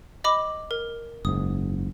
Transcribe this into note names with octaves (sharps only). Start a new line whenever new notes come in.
D#5 B5 D6
A#4
F#1 G#2 D#6